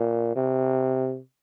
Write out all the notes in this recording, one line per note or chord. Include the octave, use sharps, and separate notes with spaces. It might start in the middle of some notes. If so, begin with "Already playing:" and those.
Already playing: A#2
C3